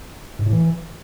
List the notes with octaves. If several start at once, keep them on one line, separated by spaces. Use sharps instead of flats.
G#2
A2
E3